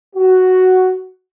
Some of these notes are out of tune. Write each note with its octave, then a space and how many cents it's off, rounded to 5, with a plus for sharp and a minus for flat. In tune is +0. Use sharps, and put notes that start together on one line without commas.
F#4 +5